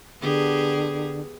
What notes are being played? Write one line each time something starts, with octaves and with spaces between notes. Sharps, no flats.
D3 B3 G4 G#4